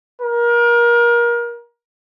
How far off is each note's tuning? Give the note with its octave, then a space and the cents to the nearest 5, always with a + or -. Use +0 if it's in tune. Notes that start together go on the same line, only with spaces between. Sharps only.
A#4 +30